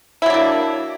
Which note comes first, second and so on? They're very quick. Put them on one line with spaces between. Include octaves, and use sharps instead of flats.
E4 F#3 D4 A#3